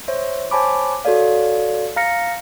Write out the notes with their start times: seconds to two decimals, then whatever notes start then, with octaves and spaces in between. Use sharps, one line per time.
0.08 C5 C#5 E5
0.51 C5 C#5 G#5 A5 B5 D6
1.05 F#4 A4 C#5 D5 F5
1.96 F5 A#5 F6 A#6 C#7